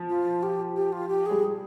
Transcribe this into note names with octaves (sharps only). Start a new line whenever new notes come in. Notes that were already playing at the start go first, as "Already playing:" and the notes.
Already playing: F3
F4
G4
G4
F4
G4
G3 G#4